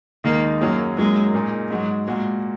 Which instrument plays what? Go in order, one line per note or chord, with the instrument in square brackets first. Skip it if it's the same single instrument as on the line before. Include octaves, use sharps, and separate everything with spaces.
[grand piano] D#2 D#3 G#3 D#4 [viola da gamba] A#3
[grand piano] F#2 F#3 C#4 G#4 [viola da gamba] A#3
[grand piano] F#2 F#3 A#3 D#4 G#4 [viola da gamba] G#3
[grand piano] A#2 A#3 D#4 G#4
[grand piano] G#2 G#3 F#4 [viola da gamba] F#3
[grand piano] A#2 A#3 F#4 [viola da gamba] G#3